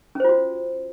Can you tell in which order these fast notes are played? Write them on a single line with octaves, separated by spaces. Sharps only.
C#4 C5 F4 F#4